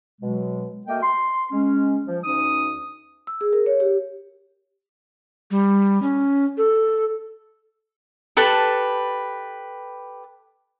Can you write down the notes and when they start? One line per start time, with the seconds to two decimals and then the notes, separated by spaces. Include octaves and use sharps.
0.20 B2 F#3 G#3
0.86 A3 A#3 F#4 A#4 D#5 G5
1.03 C6
1.51 G#3 C#4
2.06 F3
2.24 D2 C#4 D#4 D#6
3.27 E6
3.41 G#4
3.53 A#4
3.66 C#5
3.80 G4
5.51 G3
6.02 C#4
6.58 A4
8.37 G4 A4 B4 A5